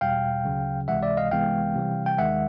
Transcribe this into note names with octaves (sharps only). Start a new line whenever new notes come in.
E2 B2 G3 F5 G5
D2 C#3 F#3
C#2 C3 E3 G#3 E5 F#5
D5 E5
D#5 F5
C2 C3 E3 G#3 B3 F5 G5
C3 E3 G3
G5
D#2 D#3 G#3 E5 F#5